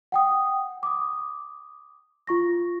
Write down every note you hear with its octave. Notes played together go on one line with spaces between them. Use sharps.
F#5 G5 D#6
D6 D#6
F4 C#6 A#6